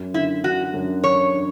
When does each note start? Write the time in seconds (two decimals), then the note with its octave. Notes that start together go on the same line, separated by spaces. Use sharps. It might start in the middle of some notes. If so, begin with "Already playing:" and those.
Already playing: F#2
0.14 D3 E4
0.44 D4 F#4
0.74 F#2
1.04 D4 C#5
1.33 D4